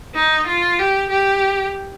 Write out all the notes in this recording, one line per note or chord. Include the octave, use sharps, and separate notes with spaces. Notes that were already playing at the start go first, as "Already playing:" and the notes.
D#4
F4
G4
G4